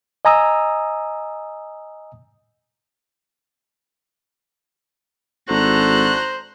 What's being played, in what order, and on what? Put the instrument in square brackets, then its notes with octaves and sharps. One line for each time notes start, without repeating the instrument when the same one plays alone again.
[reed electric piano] D#5 G#5 A#5 D#6 E6
[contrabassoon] G#1 [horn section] D4 F#4 A4 [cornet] C5 [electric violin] A#5 F#6